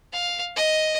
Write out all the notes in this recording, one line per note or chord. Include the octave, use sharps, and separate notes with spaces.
F5
D#5